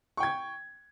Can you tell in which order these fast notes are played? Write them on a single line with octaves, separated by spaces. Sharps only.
C#6 G5 G#6